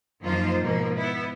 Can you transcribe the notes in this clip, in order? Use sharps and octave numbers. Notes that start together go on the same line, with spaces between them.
F#2 F3 A#3 D#4 F4 C5
G#2 B2 F3 A#3
B3 E4